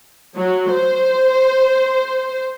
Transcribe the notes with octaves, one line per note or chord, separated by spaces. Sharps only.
F#3
C5